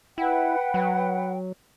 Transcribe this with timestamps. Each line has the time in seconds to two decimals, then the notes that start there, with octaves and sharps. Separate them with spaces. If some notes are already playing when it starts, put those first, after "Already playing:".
0.18 E4 B4 F#5 G5
0.74 F#3